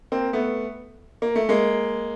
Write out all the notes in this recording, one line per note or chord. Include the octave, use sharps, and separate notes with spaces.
A#3 C4
A3 B3
A#3
A3
G#3 A#3